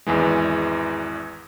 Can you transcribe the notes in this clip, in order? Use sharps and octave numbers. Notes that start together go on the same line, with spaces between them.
G#1 E2 E3 G#3